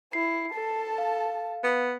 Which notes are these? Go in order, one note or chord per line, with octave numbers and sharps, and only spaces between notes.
E4 C7
A4 A5
F5
B3